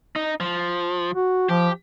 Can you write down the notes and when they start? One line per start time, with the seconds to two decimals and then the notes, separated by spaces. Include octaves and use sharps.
0.16 D#4
0.40 F3
1.15 F#4
1.49 F3 G4